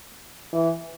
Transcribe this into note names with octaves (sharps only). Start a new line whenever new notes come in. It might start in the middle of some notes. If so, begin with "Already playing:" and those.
E3